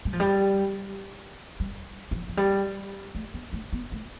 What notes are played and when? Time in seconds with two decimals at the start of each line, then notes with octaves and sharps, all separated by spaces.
0.05 G3
0.13 F3
0.20 G3
1.60 G3
2.11 F3
2.28 F3
2.37 G3
3.15 A3
3.34 B3
3.53 A3
3.73 B3
3.92 A3